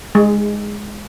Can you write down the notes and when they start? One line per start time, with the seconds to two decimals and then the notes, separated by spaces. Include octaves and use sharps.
0.15 G#3